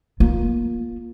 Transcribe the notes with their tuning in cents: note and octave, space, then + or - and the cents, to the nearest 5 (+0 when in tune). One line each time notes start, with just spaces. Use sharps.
A#3 +20 F4 +0